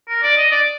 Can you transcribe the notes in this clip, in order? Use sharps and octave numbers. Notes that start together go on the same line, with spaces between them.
A#4
D5
D#5
D5